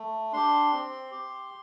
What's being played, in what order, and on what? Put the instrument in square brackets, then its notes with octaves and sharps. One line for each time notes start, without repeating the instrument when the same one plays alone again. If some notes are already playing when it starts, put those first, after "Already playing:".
Already playing: [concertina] A3
D4 G4 C6
C4
G4